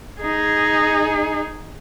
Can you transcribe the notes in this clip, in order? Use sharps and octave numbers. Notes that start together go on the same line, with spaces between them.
D#4 G#4